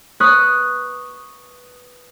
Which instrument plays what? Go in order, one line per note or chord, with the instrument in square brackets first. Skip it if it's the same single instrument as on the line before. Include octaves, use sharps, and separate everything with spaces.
[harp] B4 C#6 D#6 F#6